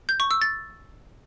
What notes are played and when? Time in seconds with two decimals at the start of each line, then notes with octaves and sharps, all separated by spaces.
0.09 G6
0.20 C#6
0.31 E6
0.41 A6